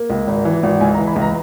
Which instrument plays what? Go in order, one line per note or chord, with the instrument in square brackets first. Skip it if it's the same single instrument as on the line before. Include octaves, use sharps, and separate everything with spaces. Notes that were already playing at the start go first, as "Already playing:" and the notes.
Already playing: [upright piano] A#3
C#2
G#1
E3
G#1
C#2 G#5
A#5
E3
B5
C#2
A#5